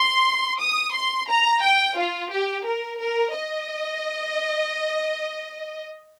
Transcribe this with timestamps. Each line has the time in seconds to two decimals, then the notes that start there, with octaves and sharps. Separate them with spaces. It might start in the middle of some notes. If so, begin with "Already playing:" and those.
Already playing: C6
0.59 D#6
0.93 C6
1.28 A#5
1.62 G5
1.97 F4
2.31 G4
2.65 A#4
2.99 A#4
3.34 D#5